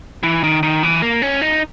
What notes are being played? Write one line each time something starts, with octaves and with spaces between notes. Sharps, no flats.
E3
D#3
D#3
E3
A#3
C#4
D#4